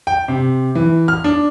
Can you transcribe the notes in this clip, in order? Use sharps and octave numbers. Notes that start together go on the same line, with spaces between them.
G5
C3
E3
F6
D4